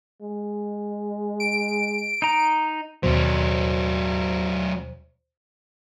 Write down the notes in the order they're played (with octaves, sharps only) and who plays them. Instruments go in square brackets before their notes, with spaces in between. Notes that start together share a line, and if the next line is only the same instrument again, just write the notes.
[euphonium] G#3
[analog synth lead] D7
[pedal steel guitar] D#4 A#5
[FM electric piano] D#2 B2 C5 [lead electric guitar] F#3 D4